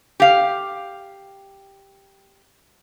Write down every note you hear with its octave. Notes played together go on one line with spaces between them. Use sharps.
G4 F5